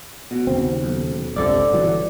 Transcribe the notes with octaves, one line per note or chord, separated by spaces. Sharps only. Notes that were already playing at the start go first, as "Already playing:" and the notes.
B2
D#2 C#3 C4
B1
F#1 C#2 C3 A4 D5
G1 E3 F#3